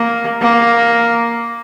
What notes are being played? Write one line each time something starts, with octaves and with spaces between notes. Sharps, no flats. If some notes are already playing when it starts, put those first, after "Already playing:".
Already playing: A#3
A#3